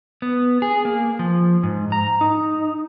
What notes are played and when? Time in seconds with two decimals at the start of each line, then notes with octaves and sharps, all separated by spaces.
0.22 B3
0.62 G#4
0.85 A#3
1.19 F3
1.63 G#2
1.92 A#5
2.21 D#4